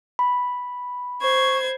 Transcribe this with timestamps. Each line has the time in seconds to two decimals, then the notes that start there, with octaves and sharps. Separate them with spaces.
0.19 B5
1.21 C5 C#6 G#6